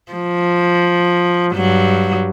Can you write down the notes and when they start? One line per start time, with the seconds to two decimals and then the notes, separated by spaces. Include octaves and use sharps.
0.12 F3
1.54 G2 F#3